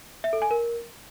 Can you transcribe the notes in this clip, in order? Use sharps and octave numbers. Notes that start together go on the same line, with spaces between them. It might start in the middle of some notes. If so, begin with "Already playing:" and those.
E5
A4
G#5
A#4